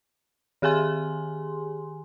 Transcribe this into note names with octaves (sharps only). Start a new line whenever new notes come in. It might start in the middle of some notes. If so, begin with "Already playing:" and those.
D#3 G4 G#4 G#5 C6